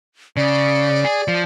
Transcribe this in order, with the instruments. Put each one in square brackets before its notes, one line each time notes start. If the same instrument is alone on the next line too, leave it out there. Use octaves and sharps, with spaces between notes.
[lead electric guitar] C#3 [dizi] D5
[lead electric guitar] G#4
F3